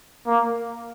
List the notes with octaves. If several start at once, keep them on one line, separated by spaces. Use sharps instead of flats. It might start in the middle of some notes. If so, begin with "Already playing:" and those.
A#3